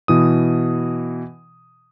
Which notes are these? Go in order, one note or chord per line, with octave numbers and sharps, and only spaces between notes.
B2 E3 D#6